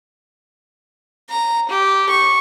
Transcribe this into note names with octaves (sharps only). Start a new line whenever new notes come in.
A#5
G4
C#6